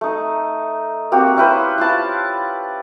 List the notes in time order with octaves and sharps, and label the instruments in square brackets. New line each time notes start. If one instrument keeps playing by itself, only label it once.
[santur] A3 D#4
A#3 C4 F#4 G4
C#4 E4 B4 C5
E4 F4 A5